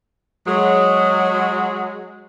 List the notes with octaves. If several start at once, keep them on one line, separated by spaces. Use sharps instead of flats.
F#3 G#3